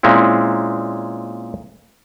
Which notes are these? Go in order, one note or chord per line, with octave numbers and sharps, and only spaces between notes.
A#2 G#3 C4 C#4 E4